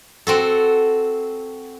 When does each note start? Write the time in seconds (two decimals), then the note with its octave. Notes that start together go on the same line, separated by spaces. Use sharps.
0.27 C4 F#4 A4